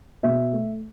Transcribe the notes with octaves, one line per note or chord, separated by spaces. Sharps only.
B2 E5
A3